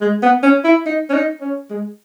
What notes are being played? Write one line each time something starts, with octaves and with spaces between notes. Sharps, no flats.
G#3
B3
C#4
E4
D#4
C#4
D#4
C#4
G#3